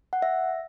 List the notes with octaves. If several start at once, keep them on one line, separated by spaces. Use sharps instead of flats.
F#5
E5